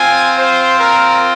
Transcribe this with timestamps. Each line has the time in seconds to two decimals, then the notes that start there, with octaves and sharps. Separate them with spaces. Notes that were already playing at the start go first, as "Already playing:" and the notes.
Already playing: C4 F4 G#5
0.34 C5
0.79 A#4